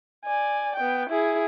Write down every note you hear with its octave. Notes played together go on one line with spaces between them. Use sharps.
D5 G#5
B3 G5
E4 G#4